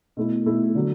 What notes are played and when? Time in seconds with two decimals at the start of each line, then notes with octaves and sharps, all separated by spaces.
0.17 B2 A3 E4
0.46 B2 A3 E4
0.75 D3 F#3